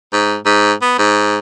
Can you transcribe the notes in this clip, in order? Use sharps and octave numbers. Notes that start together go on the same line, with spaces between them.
G#2
G#2
B3
G#2